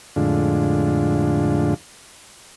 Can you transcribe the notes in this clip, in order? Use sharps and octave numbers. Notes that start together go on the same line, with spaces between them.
F2 A2 D3 G#3 D4 F4